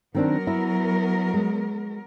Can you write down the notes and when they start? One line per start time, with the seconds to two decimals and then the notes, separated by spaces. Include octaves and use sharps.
0.15 D#3 F#3 B3 C4 D4 A#4
0.47 E4
1.34 G#3